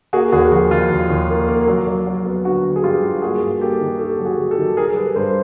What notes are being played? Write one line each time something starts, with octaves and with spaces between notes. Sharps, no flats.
A#3 F#4 G#4
D#2 F#4 G#4
F3 F#4
D#2 F4
D#2
D#2
A#3
A#3
F#3
F#3
F#3
B3
D3 F#4
D3
G#4
G2 F4 G4
G2
A#3 F#4 G#4
G2
A#3 G4 A4
D#3
A#3 G4 A4
F#3
F#4 G#4
F#3
G4 A4
D#3
G3 G#4 A#4
G3 A4 B4
G2 A#4 C5